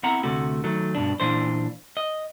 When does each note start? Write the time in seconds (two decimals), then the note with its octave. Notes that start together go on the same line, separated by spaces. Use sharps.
0.03 B3 C4 E4 F#5 A#5
0.23 D2 C3 A3 F#4
0.64 D#3 F#3 A3
0.95 G2 B2 D4
1.20 A#2 E3 D4 C5
1.97 D#5